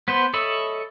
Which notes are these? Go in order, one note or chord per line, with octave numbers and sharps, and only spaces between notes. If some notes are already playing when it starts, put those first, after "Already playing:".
B3 B4 C5
A4 C#5 D#5 E5 B5